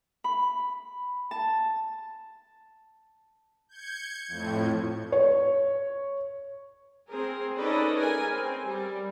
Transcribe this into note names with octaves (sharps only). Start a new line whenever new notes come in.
B5
A5
G6 G#6 C#7
F2 A2
C#5
C4 G#4 A#4
C#4 D#4 A4 B4 D5 D#5
G#4 A#4 G#5
C4
G3